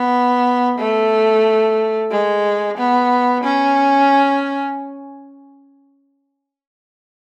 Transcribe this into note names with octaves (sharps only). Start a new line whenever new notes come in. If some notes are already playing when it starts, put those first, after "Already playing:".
Already playing: B3
A3
G#3
B3
C#4